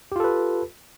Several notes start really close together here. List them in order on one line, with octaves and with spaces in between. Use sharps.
G4 F4 A4 B4